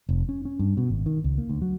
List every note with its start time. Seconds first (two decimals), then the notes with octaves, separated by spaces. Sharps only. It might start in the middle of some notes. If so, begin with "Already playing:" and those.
0.09 F1
0.29 C#4
0.45 C#4
0.59 G2
0.77 B2
0.90 G#1
1.06 D#3
1.24 C#2
1.38 A#3
1.49 D2
1.62 F#3